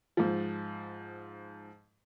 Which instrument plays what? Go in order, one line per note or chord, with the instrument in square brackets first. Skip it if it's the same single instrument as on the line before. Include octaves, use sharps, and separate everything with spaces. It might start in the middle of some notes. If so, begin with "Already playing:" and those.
[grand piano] G#2 F3